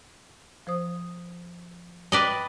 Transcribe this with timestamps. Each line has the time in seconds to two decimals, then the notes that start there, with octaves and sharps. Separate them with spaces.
0.67 F3 C5 D#6
2.12 B4 D5 D#5 G5 D6 F#6